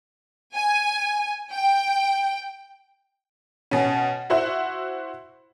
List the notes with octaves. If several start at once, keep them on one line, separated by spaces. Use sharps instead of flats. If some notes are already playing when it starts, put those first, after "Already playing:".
G#5
G5
B2 C#4
E4 F#4 C5 E5